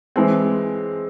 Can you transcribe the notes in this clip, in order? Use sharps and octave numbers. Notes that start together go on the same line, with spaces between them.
E3 G#3 C4